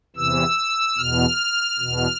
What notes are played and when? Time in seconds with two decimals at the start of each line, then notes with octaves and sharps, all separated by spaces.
0.16 E2 C3 E3 E6
0.97 E2 B2 F6
1.79 E2 B2